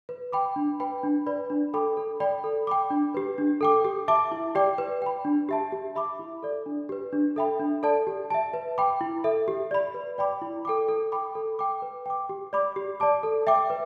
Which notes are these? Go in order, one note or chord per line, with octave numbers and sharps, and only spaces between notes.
B4
G5 B5 D6
D4
B4 G5 B5
D4
B4 D5 B5
D4
A4 G5 B5 D6
A4
D5 G5 B5
A4
G5 B5 D6
D4
G4 B4
D4
A4 G5 D6
G4
E5 A5 D6
E4
G4 D5 G5 D6
B4
G5 B5
D4
G4 E5 A5
G4
E5 B5 D6
E4
A4 D5
D4
G4 B4
D4
A4 E5 G5 B5
D4
A4 D5 A5
G4
E5 A5
B4
G5 B5 D6
E4
A4 E5
G4
D5 B5
B4
D5 G5 B5 D6
E4
A4 G5 D6
A4
G5 B5 D6
A4
G5 D6
B4
G5 D6
G4
D5 B5 D6
G4
D5 A5 D6
A4
E5 G5 D6
B4